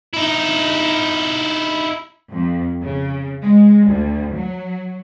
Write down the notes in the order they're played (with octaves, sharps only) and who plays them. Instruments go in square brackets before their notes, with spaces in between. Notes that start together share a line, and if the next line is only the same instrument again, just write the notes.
[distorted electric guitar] D#4 E4
[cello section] F2
C#3
G#3
D2
F#3